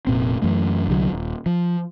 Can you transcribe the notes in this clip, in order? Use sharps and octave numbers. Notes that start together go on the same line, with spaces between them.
F1 A#2 C4
F#2 E3 A3
C2 D3 F3 F#3
D#1
F3